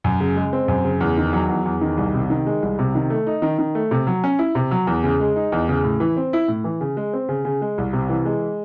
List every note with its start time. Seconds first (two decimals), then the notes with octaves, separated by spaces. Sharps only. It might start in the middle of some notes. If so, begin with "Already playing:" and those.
0.04 F#2
0.20 C#3
0.36 G#3
0.53 C4
0.68 F#2
0.85 C#3
1.01 E2
1.17 D#3
1.33 F#3
1.49 E2
1.66 E2
1.81 D#3
1.97 C2
2.14 C3
2.30 D#3
2.46 G#3
2.62 C2
2.79 C3
2.95 D#3
3.10 A3
3.27 D#4
3.42 D#3
3.58 D#3
3.75 A3
3.91 C3
4.07 F#3
4.24 C#4
4.39 E4
4.55 C3
4.71 F#3
4.87 E2
5.04 C#3
5.20 G#3
5.36 D#4
5.52 E2
5.69 C#3
5.84 A2
6.00 E3
6.17 C4
6.33 E4
6.48 A2
6.64 E3
6.81 C#3
6.97 G#3
7.13 C4
7.29 C#3
7.45 C#3
7.62 G#3
7.78 C2
7.93 C3
8.09 E3
8.25 G#3